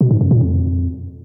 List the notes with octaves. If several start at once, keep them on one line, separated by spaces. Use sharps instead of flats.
B2
G#2
F#2
A#2
F2